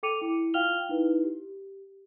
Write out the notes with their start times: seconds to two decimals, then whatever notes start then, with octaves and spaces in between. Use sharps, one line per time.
0.03 A4 G5 D6 C#7 D#7 F7
0.21 E4
0.54 F4 F5 G5 F6 F7 G7
0.89 D#4 E4 B4
1.24 G4